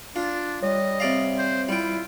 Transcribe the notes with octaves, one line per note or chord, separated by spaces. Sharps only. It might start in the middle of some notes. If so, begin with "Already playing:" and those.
D4 F4
G3 C#5 D#5
C3 D5 F5
C5
G3 E4 F4 G5